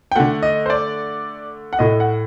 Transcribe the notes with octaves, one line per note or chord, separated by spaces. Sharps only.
G5
D3 A3 F#5
D#5
C5
D5
F#5
A2 A3 D#5
F#5